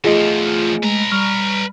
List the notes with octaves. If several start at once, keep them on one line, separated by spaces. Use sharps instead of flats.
E2 F3 A3 F4 G#4 D#5 G#5
G#3 B4 A#5
G3 C#6 F6